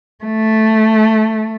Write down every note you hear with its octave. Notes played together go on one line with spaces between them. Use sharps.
A3